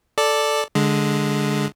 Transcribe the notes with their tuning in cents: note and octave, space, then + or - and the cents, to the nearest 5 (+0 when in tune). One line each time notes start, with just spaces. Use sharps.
A4 +0 D5 +0
D3 -5 G#3 +0